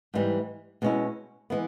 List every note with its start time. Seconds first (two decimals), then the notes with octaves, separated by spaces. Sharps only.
0.14 G#2 E3 G3
0.82 B2 G#3 C#4 E4
1.50 E3 G#3 B3